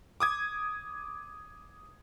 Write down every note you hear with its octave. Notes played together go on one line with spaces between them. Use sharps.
D6 D#6 G#6